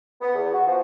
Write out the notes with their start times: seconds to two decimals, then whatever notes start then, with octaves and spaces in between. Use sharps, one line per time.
0.21 B3
0.35 E2
0.52 F#4
0.67 F3